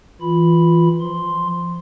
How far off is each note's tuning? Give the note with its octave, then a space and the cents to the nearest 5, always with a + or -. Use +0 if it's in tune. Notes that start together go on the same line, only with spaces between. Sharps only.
E3 +0 F4 +0 B5 +0
F3 -15 C6 +0